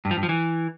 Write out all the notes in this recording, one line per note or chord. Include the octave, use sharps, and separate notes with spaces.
G2
F3
G2
F3
E3